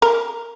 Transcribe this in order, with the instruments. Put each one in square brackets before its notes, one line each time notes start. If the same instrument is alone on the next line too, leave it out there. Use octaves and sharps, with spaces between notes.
[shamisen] A#4